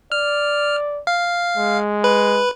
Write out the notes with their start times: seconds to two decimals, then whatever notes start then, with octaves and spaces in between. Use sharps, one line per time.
0.12 D5 F6
1.07 F5
1.57 G#3
2.04 B4